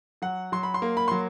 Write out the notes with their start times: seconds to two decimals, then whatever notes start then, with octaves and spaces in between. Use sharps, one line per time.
0.22 F#3 F#5
0.52 F#3 C6
0.63 B5
0.74 C6
0.82 A#3
0.97 B5
1.08 F#3 C6